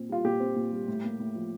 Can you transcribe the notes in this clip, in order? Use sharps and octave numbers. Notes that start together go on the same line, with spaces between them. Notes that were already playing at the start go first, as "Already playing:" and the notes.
Already playing: A#2 C4
G3 F4
A#2 G4
C4
A#2
G3
A2
A#3
A2
F3